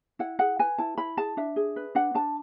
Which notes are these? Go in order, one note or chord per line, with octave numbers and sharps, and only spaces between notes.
E4 F#5
G#4 F#5
B4 G#5
E4 A5
E4 B5
G#4 A5
D4 E5
G#4
B4
D4 F#5
D4 A5